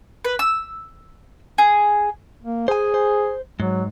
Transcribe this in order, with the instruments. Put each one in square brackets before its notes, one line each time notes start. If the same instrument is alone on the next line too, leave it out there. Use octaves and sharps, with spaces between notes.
[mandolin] B4
E6
G#4
[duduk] A#3
[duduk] G#4 [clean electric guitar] C5 G#5
[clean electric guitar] C5
[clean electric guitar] G#2 [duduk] F#3